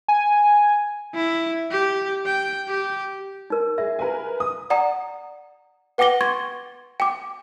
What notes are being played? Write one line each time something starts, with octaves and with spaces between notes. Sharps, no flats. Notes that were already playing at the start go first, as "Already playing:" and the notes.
G#5
E4
G4
G5
G4
D#4 A#4
G#4 E5
A#4 B4 G#5
D#6
D5 F#5 A#5 D#6
B4 F#5 G5 D6 A#6 G7
C6 C#6 G#6 A6
G5 D6